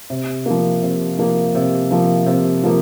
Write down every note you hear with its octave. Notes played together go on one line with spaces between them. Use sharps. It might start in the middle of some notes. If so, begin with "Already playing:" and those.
C3
F3 A#3
C3
F3 A#3
C3
F3 A#3
C3
F3 A#3